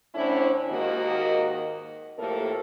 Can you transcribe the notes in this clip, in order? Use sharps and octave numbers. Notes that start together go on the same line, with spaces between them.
A2 D3 C#4 D4 E4 C5
D#2 G#2 D#3 A#3 F#4 D#5
F2 A2 A#3 G4 A4 A#4